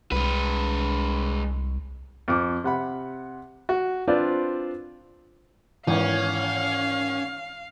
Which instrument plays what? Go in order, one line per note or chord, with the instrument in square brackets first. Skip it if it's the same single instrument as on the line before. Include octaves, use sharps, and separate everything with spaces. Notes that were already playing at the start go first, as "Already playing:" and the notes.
[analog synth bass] C2 [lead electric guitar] G#3 B4
[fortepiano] F2 F3 D6
C3 F#5 B5
F#4
C4 D4 F4 B4 C5 D5
[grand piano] G#1 [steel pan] E3 [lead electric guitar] C#4 [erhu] F5